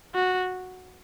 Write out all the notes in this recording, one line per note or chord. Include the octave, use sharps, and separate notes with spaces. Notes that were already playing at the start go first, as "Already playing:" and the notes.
F#4